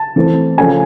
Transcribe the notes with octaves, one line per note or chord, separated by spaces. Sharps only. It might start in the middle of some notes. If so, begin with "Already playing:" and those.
Already playing: A5
E3 A3 C4
C#3 F3 A3 C#4 G#5